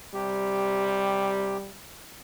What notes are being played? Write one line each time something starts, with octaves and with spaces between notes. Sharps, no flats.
C3 G3 G4